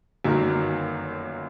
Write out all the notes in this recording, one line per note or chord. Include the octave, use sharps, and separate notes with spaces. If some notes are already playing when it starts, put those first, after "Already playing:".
G1 F#2 D#3 F#3 A#3